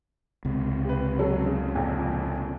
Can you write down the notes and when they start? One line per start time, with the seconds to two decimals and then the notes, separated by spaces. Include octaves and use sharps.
0.45 C#2 C3
0.85 G4 B4
1.19 F#3 C#4 A4
1.46 C#3
1.75 A#1 F2